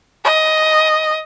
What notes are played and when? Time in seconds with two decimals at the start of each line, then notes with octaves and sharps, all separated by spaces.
0.25 D#5